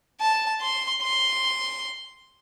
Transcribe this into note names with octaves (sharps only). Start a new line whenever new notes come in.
A5
C6
C6